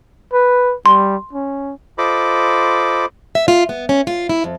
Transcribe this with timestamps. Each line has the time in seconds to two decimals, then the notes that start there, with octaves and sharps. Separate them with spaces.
0.33 B4
0.86 G3 C6
1.33 C#4
1.98 F4 A4 C5 D#5 B5 D6
3.35 E5
3.48 F4
3.69 B3
3.89 C#4
4.07 F4
4.29 E4
4.44 F2